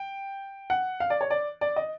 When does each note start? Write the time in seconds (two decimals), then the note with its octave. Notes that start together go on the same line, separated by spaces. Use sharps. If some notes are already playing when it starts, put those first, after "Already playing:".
Already playing: G5
0.70 F#5
1.00 F5
1.10 D5
1.21 C#5
1.31 D5
1.61 D5
1.76 D#5